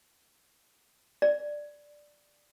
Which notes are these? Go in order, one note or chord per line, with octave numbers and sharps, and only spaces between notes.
D5